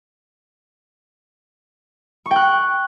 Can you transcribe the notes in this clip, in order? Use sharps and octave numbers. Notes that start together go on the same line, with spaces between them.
C#6
G5
F#6